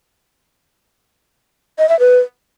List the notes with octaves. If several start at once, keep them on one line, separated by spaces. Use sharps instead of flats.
D#5
E5
B4